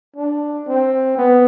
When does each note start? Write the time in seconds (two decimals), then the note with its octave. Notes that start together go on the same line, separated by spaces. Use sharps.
0.17 D4
0.68 C4
1.18 B3